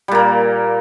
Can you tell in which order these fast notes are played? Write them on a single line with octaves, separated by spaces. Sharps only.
G3 A#2 A#3